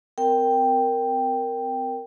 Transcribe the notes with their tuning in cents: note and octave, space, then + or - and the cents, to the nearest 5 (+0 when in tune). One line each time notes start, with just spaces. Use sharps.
C4 -30 A#4 +0 G5 +0